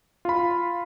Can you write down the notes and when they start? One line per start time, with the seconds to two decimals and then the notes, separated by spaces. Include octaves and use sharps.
0.25 F4 B5